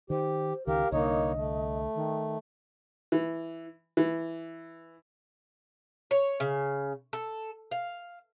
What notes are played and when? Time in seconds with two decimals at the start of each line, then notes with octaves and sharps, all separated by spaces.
0.10 D#3 G4 C5
0.67 C#2 D#3 G4 A#4 F5
0.92 C2 D3 A#3 D#4 C#5 D#5
1.35 A3
1.95 D#3
3.12 E3
3.97 E3
6.11 C#5
6.40 C#3
7.13 A4
7.71 F5